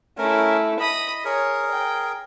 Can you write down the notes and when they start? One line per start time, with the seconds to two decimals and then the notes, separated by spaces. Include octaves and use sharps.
0.18 A3 C#4 E4 A#4
0.79 D#5 B5 D#6
1.25 G#4 A#4 C#5
1.71 G5